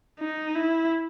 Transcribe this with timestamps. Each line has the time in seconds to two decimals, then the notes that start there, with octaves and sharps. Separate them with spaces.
0.20 D#4
0.55 E4